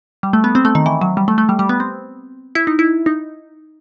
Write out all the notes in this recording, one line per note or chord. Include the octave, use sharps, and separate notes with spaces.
G3
A3
B3
C4
A3
D#3
E3
F#3
G3
A3
A3
G3
G3
B3
C4
E4
D#4
E4
D#4